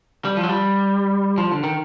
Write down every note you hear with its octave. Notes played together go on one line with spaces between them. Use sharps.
G3
F3
F#3
G3
F3
D3
D#3